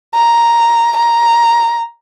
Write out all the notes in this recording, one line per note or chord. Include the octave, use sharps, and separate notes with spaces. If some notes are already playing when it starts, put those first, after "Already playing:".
A#5
A#5